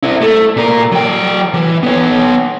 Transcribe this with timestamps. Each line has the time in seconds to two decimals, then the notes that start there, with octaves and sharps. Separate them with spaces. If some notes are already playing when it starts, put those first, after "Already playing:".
0.03 C4 E4
0.21 A3
0.57 A#2 A#4
0.92 F#3 G5
1.54 E3
1.83 B3 C#5